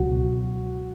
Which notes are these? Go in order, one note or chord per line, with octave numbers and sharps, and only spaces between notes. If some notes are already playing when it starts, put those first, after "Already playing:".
Already playing: C#2 B2 F#3 F#4